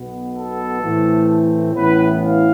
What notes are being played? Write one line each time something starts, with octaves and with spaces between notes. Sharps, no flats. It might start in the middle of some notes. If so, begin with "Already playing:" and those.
Already playing: B1 B2 B3
A4
A2 E3 A3 C4
A1 A2 E3 B3 B4
F5